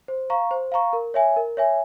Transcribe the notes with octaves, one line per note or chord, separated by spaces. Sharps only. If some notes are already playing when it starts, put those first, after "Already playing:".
C5
F5 A#5 C#6
C5
F5 A#5 C#6
A#4
C#5 E5 G#5
A#4
C#5 E5 G#5